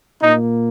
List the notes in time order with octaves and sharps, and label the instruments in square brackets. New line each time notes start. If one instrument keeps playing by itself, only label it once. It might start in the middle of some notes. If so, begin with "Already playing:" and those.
[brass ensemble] A#2 A#3 D#4